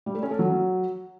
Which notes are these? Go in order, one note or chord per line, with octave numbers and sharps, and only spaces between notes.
G3
A3
C#4
A4
F#3